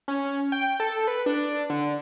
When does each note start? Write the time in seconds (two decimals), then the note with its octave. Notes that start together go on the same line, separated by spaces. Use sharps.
0.08 C#4
0.52 G5
0.80 A4
1.08 B4
1.26 D4
1.70 D3